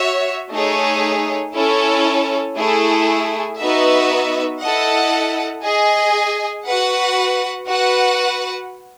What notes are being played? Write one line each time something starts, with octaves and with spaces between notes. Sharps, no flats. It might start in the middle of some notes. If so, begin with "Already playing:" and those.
Already playing: F#4 C#5 E5
A3 D#4 G#4 C#5
C#4 E4 A4 C#5
A3 E4 G#4
B3 D#4 F#4 B4 E5
E4 A4 D#5 F#5
G#4 D#5 G#5
F#4 B4 F#5
F#4 B4 F#5